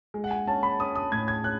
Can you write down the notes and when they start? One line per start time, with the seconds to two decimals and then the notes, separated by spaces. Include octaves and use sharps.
0.14 G#3
0.24 F#5
0.31 G#5
0.47 C#4 A5
0.63 B5
0.80 C#4 D#6
0.95 D#6
1.12 A2 G#6
1.28 G#6
1.44 C#4 F#6